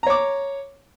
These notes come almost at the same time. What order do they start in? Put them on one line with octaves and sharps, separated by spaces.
A#5 C#5 D6